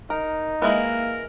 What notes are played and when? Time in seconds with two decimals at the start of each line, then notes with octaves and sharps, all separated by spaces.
0.10 D#4 A#4
0.62 G#3 A#3 E4 A#4 B4